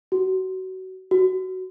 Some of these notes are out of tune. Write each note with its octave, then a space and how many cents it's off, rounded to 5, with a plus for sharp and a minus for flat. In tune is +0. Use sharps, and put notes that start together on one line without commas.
F#4 +25
F#4 +10